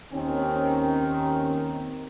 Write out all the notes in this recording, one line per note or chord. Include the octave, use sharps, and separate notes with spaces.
D#2 D#3 C4 C#4